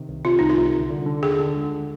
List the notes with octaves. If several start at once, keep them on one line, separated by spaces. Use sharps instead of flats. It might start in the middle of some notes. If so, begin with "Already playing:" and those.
Already playing: C3 D#3
C2
C3 F4
C2 D#4
F4
C2
D3
D3
D3
D#2 G#4
D3
G#3